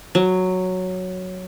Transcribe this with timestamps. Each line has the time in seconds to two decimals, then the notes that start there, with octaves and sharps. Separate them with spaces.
0.15 F#3